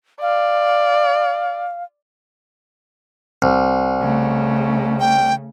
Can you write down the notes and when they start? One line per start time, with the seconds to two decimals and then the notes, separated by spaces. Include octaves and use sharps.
0.22 D5 F5
3.42 C2
4.01 C#3 A3
5.00 G5